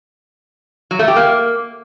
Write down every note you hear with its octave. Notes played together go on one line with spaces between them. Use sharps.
F#3
A3
G4
A#3